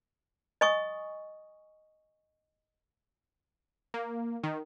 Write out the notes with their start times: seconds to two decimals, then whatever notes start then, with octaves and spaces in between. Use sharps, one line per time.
0.61 D#5 G#5 C#6 D#6
3.94 A#3
4.43 D#3